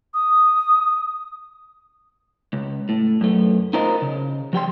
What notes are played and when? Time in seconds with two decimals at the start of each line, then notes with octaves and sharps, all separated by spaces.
0.14 D#6
2.53 C#2
2.89 A2
3.21 F#2 A3
3.73 D#4 F4 A#4 C5 D#5
4.02 C#3
4.53 F3 G4 G5 C6